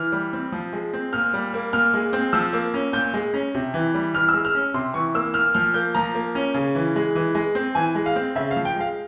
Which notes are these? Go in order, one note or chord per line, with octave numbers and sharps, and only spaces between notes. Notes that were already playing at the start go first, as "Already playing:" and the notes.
Already playing: E3 F6
G3
C4
F3
G#3
C4
A#2 F6
G3
A#3
A#2 F6
G#3
C4
F3 E6
A#3
C#4
A#2 G6
G#3
C#4
C3
E3
G3
E3 F6
E6
G#3
F6
C#4
C3 C6
E3 C#6
A#3 E6
A#2 F6
F3 F6
A#3 G6
F3 A#5
A#3
C#4
C#3
E3
G#3
E3
G#3
C4
E3 G#5
G#3
F5
C4
C#3 E5
F5
F3
G5
G#3 F5